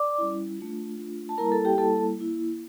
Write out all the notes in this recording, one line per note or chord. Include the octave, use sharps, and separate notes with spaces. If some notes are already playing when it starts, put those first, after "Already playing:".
Already playing: D5 D6
G3 C#4 E4
A3 D4 F4
A3 D4 F4
A5
G3 A#3 E4 A#4 A#5
A4 A5
G4 G5
G3 A#3 E4 A4 A5
A#3 E4